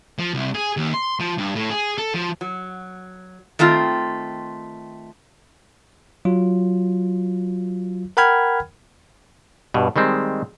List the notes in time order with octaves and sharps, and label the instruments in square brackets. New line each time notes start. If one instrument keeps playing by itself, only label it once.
[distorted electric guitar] F3
C2
G#4
D#2
C6
F3
G2
A2
G#4
A4
F3
[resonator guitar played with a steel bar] F#3
D#3 A3 C4 F4
[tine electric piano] F#3 F4
A#4 F#5 G5 B5 F6 G#6
[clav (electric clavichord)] G2 B2
D#3 G3 G#3 C4